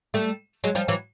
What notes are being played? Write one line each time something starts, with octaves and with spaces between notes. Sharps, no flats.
G3 A3
F#3 G#3
F3 G3
E3 F#3